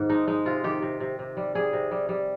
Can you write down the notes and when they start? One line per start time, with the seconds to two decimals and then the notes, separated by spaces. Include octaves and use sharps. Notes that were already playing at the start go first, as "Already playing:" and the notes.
Already playing: G#2 D#3
0.09 G#3 D#4
0.27 G#3 D#4
0.45 C3 F4
0.64 D#3 G4
0.82 C3
1.00 C3
1.19 C3
1.37 G3
1.55 G3 G#4
1.73 C3
1.91 G3
2.09 G3